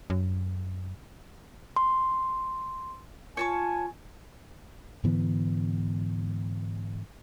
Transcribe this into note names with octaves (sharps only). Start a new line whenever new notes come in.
F#2
C6
F4 C#5 G#5 A5 C#6
G#2 D3 E3 B3